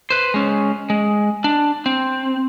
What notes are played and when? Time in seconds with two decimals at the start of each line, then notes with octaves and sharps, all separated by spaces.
0.10 B4 C5
0.34 G#3 C#4
0.90 G#3
1.44 D4
1.86 C4